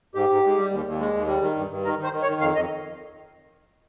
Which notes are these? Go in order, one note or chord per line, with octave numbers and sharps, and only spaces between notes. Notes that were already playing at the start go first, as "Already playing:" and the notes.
G#2 G4
G#2
G#2
G3
D#2
D#2
G#3
D#2
G3
D#3
G2
G2
D#3 A#4
D#3 C5
D#3
C#5
D#3
F2 F5
F2 D#5